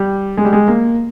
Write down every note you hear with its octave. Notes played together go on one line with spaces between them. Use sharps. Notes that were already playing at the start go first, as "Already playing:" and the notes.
Already playing: G3
G#3
G3
G#3
A#3